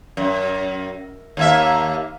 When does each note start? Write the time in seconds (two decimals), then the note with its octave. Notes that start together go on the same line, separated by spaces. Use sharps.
0.17 F#2
1.37 D#2 A#3 E5